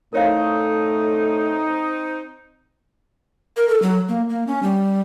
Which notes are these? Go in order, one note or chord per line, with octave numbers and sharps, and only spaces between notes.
A2 A3 C4 D#4 A#4 C#5 F5
A#4
A4
F#3
A#3
A#3
C#4
G3